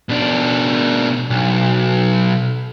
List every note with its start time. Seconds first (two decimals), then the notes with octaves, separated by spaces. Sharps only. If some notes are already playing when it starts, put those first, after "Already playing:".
0.09 B2 D4
1.30 B1